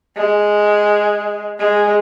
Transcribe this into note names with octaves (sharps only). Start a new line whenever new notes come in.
G#3
G#3